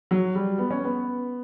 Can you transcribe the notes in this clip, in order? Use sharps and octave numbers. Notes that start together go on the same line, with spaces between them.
F#3
G3
B3
C#4
B3